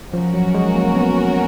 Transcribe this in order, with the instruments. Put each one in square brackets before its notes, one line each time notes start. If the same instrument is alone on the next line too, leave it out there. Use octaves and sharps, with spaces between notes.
[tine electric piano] F3 [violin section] C#4 F#4 A#4
[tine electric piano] F#3
G#3
A#3
B3